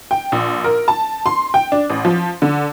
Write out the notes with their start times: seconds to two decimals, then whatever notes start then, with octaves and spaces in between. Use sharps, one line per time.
0.11 G5
0.32 A#1
0.64 A#4
0.88 A5
1.26 C6
1.54 G5
1.72 D4
1.90 A1
2.05 F3
2.42 D3